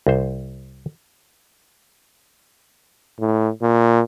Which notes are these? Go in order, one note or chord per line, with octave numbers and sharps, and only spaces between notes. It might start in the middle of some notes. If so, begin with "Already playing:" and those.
C2 C5
A2
A#2